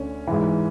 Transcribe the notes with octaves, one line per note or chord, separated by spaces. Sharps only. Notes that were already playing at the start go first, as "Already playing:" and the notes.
Already playing: D2 D3 C#4
G#2 E3